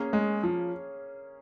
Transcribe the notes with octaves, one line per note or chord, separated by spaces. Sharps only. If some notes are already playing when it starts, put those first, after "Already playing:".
Already playing: A#3 C#4 G#4 C#5
G#3
F3